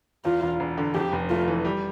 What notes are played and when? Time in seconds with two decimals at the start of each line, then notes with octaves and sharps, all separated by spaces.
0.25 E2 F4
0.43 E1
0.60 E1
0.78 D3
0.95 F2 G4
1.12 F1
1.30 A3 F4
1.48 E3
1.65 G3